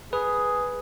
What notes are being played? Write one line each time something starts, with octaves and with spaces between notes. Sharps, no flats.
G#4 B4